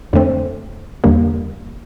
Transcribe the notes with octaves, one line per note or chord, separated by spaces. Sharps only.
F2 D3 A3 C4
E2 D3 G3 A#3